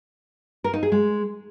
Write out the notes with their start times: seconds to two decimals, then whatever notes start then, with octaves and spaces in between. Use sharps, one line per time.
0.64 A#4
0.74 D#4
0.83 G#4
0.92 G#3